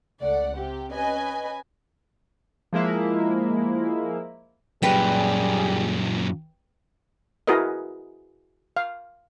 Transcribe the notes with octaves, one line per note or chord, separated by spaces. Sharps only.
C#2 A3 D5 F#5
C3 G4
C#4 B4 D#5 G#5 B5
F3 G#3 A#3 E4
F#2 A#2 G3 G#4 B4 G5
E4 F#4 G#4 A#4 B4 D#5
F5